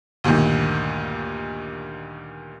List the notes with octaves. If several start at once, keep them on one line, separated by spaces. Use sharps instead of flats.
D2 G2 A#2 D#3